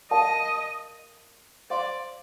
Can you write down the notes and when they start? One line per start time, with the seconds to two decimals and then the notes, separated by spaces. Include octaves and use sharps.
0.11 A#4 D5 D#5 F5 A5
1.70 C5 D5 F5 C6